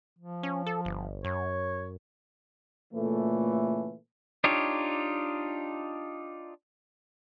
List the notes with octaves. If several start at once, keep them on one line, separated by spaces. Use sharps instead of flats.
F3
C#4
A4
G1
F#2 C#5
A#2 C#3 E3 A3
D4 D#4 F4 G4 C#5